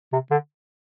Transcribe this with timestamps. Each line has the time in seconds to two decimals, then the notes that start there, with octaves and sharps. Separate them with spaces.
0.13 C3
0.31 D3